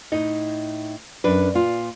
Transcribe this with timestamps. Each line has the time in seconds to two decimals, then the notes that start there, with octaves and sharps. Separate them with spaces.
0.12 A2 D#4 D#5
1.24 F#2 D4 B4
1.54 A#2 F4